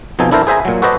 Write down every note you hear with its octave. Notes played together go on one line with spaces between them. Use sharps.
F2 B2 F3 D#4 A4 G#5
D4 E4 A4 A#4 C5
G#4 C5 E5 G#5 A#5
A#2 F#3
F#4 A4 B4 C5 D5 D#5